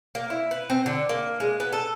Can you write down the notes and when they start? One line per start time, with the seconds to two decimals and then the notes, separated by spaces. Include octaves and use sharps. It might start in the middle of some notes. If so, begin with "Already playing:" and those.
0.15 A#3
0.30 E4
0.51 B4
0.70 C4
0.86 D3
1.09 A#3
1.40 G#3
1.60 B3
1.73 A4